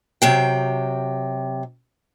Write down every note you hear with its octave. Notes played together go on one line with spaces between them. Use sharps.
C3 F#3 G5